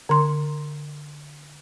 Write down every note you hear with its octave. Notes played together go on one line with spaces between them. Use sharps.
D3 C6